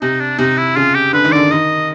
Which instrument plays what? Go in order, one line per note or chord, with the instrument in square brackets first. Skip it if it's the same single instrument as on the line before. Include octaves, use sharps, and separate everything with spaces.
[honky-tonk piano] C3 [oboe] D#4
[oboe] D4
[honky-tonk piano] C3 [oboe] D#4
[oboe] E4
[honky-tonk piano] C#3 [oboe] F4
[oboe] G4
[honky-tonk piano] D3 [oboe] B4
[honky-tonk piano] D#3
[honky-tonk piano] D3 [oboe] D5
[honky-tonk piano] D#3 [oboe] D#5